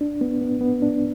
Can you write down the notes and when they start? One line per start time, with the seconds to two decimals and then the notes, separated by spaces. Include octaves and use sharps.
0.01 D4
0.21 B3
0.41 B3
0.61 B3
0.82 D4